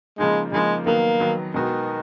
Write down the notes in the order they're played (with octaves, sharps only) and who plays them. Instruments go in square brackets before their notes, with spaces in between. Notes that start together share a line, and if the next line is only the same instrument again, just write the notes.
[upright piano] C#3 F3 A#3 D#4 [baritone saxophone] G#3
[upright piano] C#3 F3 A#3 D#4 [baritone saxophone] G#3
[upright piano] D#3 F#3 B3 [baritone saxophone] A#3
[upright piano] D#3 F#3 B3
[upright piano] B2 G#3 B3 F#4 [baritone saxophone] D#3